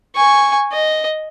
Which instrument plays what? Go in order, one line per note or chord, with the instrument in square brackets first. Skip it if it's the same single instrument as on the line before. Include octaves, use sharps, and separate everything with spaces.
[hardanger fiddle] G#5 C#6
D#5